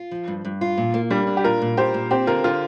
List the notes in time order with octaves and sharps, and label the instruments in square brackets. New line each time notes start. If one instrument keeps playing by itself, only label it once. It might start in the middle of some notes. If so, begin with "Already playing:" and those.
Already playing: [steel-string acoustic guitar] F4
F3
G2
G2
F4
A#2
A#3
[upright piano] G3 [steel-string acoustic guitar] D4
[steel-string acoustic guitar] D4
[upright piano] G4
[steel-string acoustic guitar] A#2 [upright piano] F4 A#4
[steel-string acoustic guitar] A#2
[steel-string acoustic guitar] A#2 [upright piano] G4 C5
[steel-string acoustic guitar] A#2
[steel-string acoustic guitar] C4 [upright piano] G4 C5
[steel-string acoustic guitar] D3 [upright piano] F4 A#4
[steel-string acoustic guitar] D3 [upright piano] F4 A#4